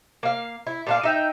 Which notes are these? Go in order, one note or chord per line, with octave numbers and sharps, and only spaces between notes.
A#3 F5
E4
A#2 D4 F5
D#4 E5 G5